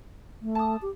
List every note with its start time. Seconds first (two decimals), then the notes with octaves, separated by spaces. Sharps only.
0.42 A3
0.55 A5 D#6
0.82 G4